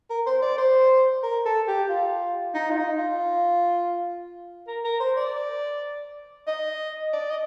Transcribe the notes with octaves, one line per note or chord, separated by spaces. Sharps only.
A#4
C5
D5
C5
A#4
A4
G4
F4
D#4
F4
D#4
F4
A#4
A#4
C5
D5
D#5
D5
D#5